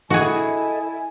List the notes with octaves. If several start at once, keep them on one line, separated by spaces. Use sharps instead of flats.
E4 F#4 G#4 A4 D#5 G#5